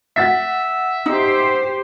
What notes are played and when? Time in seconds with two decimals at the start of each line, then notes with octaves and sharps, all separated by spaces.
0.16 E5 F#5 A6 B6
1.06 D#4 G4 C5